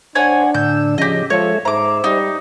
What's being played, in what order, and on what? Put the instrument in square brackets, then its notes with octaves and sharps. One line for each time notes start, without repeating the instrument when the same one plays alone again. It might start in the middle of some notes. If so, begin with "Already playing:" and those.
[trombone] D4 [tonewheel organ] C5 [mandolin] C#5 F#5 G#5
[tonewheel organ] A2 D3 E6 [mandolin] G6
[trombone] C#3 [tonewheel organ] F3 C#4 [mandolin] G4 D#5
[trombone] F3 [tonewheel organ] G#3 A4 E5 [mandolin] C#5
[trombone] G#2 [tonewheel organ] C5 E5 [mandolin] A#5 D6
[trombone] G3 [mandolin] D#4